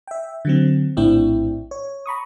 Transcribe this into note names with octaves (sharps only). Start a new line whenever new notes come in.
E5 G5
D3 F#3 C4
A#1 A2 C4 D4 E4 G5
C#5
A#5 B5 C#6 D#6